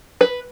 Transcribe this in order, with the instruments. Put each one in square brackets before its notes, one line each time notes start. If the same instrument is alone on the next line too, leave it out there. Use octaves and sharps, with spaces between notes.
[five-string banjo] B4